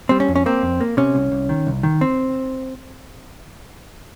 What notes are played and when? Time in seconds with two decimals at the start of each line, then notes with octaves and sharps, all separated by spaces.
0.09 G3 C4
0.20 C#4
0.28 F2
0.36 C#4
0.46 A#3 C4
0.63 F2
0.81 A#3
0.97 C3 C#4
1.15 C2
1.32 C2
1.49 D#3
1.67 C2
1.83 D#3
2.01 C4